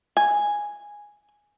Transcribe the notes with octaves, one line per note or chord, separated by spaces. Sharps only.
G#5